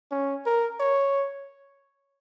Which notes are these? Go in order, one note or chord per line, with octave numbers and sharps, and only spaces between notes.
C#4
A#4
C#5